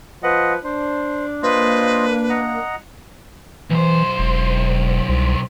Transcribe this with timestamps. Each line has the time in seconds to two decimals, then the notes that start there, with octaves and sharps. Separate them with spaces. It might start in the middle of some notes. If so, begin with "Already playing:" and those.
0.23 F3 B4 D#5 F#5
0.64 D4 C5
1.43 A#3 F4 B4 C5 D#5
2.30 D#5 F#5 A#5
3.70 B1 E3 C5
4.19 E1
5.09 C2